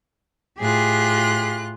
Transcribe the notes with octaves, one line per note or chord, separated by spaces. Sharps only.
A2 F4 G4 G#4 F#6